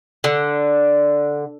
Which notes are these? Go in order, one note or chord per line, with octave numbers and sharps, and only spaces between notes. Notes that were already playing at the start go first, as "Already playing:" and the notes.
D3